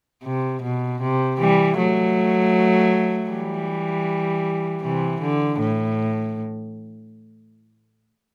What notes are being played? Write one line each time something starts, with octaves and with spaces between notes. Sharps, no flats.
C3
B2
C3
E3 G3
F#3 A3
E3 G3
C3 E3
D3
A2